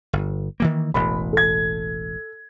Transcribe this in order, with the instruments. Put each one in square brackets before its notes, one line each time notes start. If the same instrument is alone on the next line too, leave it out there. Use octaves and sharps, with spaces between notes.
[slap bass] G1
D#3 E3 A#3
[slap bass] E1 A1 [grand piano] B5
[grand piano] A4 G#6